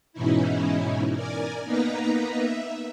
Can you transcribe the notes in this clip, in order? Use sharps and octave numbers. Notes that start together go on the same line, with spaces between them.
G#2 B2 E3 C#4 D#4 E4
A#4 D5 G#5
A#3 B3 D#4 B4 A#5
E5